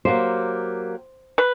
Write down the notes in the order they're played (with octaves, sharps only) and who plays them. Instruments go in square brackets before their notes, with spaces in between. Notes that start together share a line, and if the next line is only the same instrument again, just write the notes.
[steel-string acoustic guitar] F#3 A#3 G4 [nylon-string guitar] C5
[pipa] B4